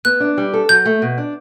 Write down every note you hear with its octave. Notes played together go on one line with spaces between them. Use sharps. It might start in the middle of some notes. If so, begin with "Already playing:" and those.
B3 F#6
D4
G3
A4
F#3 G6
A3
B2
D4